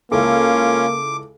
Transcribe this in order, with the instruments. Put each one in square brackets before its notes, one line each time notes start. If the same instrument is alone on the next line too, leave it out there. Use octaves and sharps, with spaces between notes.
[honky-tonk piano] C#2 E4 A4 [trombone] A#3 [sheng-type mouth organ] C#4 F4 [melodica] D6